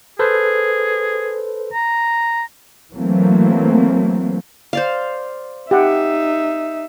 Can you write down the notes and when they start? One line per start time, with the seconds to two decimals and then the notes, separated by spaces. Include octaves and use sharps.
0.19 G#4 A4 B4 C5
1.74 A#5
2.93 E3 F#3 A3 A#3 C4
4.73 C5 D5 F5
5.71 D#4 G4 E5 F#5